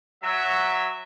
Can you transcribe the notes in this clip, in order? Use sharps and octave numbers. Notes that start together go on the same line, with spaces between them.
F#3 E5